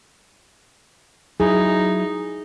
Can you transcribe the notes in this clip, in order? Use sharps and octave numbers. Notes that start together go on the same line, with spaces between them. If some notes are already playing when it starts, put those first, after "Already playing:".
F#3 D#4 E4 G#4